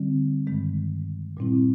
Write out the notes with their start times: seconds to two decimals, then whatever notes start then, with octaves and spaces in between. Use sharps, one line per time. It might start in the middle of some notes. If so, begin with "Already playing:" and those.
Already playing: D3 G3 C4
0.47 G2 D#3 G#3
1.37 A#2 G3 C4 E4